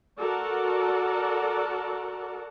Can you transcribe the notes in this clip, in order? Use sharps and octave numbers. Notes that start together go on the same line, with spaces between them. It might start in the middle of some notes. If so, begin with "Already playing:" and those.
F#4 A4 A#4 D5 F#5